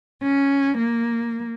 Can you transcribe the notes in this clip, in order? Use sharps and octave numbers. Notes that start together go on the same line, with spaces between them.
C#4
A#3